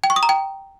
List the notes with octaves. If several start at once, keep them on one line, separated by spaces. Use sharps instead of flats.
G5
C#6
D#6
A#5
G5